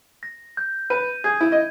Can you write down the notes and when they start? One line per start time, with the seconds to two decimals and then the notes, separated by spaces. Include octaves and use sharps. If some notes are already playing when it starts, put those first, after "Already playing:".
0.23 A#6
0.57 G6
0.90 B4 D#7
1.24 G#4 G#6
1.41 E4
1.52 D#5